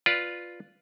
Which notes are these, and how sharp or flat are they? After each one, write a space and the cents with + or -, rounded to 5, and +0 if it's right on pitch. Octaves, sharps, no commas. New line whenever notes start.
F4 +0 B4 +0 D5 +0